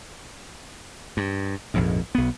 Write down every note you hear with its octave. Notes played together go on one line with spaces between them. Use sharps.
G2
A#1 F2 G#2
B1 B3